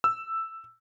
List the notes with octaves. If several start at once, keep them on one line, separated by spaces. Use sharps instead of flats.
E6